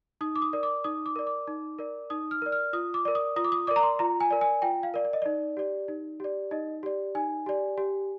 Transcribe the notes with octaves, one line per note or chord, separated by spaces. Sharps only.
D#4 D#6
D6
D#6
A#4 D5
D6
D#4 D#6
D6
A#4 D5
D6
D#4
A#4 D5
D#4 D#6
F6
A#4 D5
F6
F4 D#6
D6
A#4 D5
D#6
F4 D#6
D6
D#6
A#4 D5 D6
A#5
C6
F4 A#5
G#5
A#4 D5
G#5
F4 G5
F5
A#4 D5
D5
D#5
D#4 D5
G4 D5
D#4
G4 D5
D#4 D#5
G4 D5
D#4 G#5
G4 D5
G4